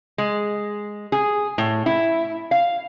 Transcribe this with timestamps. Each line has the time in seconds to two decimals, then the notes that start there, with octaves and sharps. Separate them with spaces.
0.18 G#3
1.12 G#4
1.58 A2
1.86 E4
2.51 F5